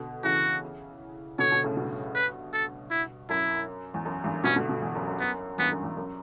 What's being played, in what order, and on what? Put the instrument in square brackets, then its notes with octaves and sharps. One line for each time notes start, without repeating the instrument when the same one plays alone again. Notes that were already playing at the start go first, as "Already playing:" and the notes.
Already playing: [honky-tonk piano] B2 D3
[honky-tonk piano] C#3 E3 [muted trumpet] F#4
[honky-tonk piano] B2 D3 [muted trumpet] C#5
[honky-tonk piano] B2 D3
A2 C#3
G2 B2
[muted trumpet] B4
A4
E4
[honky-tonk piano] F#2 [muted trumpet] E4
[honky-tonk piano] E2
F#2
E2 G2
[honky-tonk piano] G2 B2 [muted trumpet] C#4
[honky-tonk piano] B2 D3
B2 D3
E2
F#2
F#2
[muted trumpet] B3
[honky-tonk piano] E2 G2 [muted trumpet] B3
[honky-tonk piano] F#2
E2
F#2